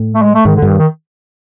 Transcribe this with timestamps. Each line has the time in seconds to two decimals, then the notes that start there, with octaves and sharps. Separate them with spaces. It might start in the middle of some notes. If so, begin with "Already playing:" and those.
Already playing: A2
0.14 A3
0.22 G#3
0.34 A3
0.45 G#2 D#3
0.56 D3
0.62 G2 D#3
0.79 D#3